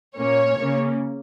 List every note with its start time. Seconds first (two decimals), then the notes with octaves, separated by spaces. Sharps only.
0.18 A#2 A#3 C#4 C#5
0.58 C#3 A#3 C#4